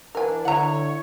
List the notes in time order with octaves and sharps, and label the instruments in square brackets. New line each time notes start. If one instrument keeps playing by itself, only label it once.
[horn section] E3 D4 [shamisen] A#4 G#5
[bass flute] D3 [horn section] E4 C#5 [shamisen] F#5 A#5